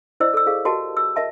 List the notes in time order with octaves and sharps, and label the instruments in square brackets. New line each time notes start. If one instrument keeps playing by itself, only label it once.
[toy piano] E4 C5 D5 D#5 E6
A4 E6
G#4 A4 F5
F#4 G4 A#4 D#5 A5
E6
A#4 D#5 E5 A5